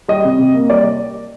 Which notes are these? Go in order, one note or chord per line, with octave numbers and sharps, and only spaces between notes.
G3 D#5
C3
C3
A#3
G3 D5